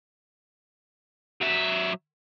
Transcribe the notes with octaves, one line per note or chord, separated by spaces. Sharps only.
F#3 E5